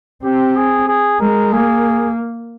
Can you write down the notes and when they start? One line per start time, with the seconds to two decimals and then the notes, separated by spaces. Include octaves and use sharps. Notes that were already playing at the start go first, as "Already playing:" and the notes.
0.24 C4 G4
0.56 G#4
0.88 G#4
1.20 G#3 A#4
1.53 A#3 G#4